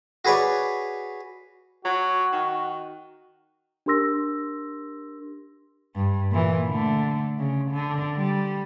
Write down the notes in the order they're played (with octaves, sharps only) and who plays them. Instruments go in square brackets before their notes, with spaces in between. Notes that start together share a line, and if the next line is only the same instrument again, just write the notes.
[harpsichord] F#4 G#4 B4 C#5 D5
[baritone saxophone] F#3 [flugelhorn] F#4
[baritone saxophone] D#3
[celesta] D4 G4 A#4 C6 E6 A#6
[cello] G2
A#2 E3
D3 A3
C#3
D3
G3